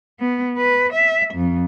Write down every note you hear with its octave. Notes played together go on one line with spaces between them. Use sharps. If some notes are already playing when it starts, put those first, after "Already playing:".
B3
B4
E5
F2